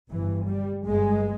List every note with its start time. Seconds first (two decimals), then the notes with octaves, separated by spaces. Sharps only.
0.11 G1 G2 E3
0.49 G3
0.86 G1 G2 G#3